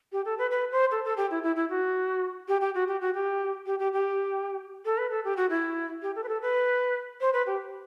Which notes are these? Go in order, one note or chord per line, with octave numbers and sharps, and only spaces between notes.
G4
A4
B4
B4
C5
A4
A4
G4
E4
E4
E4
F#4
G4
G4
F#4
G4
F#4
G4
G4
G4
G4
A4
B4
A4
G4
F#4
E4
G4
A4
B4
A4
B4
C5
B4
G4